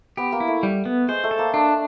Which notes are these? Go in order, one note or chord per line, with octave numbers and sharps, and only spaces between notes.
B3 G4
A#3
E4
A3
G3
B3
G#3 C5
A3
A4
A#3
A3 D4